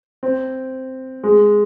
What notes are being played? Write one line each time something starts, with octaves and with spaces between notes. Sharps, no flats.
C4
G#3